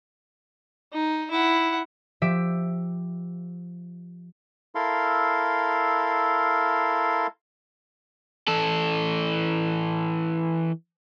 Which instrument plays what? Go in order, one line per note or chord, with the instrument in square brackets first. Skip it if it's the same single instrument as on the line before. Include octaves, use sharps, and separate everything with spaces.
[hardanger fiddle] D#4
E4 F#5
[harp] F3 G4 E5 D7
[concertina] E4 A4 A#4 F5 C6
[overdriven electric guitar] E3 A4